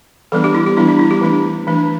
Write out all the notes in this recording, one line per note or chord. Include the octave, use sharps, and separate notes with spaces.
E3 G3 B3 D4 A4
G4
E4
G4
E3 G3 B3 D4 E4
D4
E4
G4
E3 A3 D4
E3 A3 D4